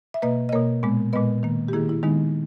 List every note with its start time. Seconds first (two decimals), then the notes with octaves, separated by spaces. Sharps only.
0.14 E5
0.22 B2 A#3 B4 D#5
0.49 D#5
0.52 B2 A#3 A#4 C#5
0.83 A#2 G#3 B3
1.13 A#2 G#3 B3 B4 D#5
1.43 D#3 A#3
1.68 G4
1.73 D#3 A#3 E4 G#4
1.89 E4
2.03 D#3 G#3 B3 D#4